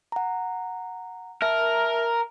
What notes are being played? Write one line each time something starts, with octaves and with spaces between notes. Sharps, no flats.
F#5 A#5
A#4 E5 A5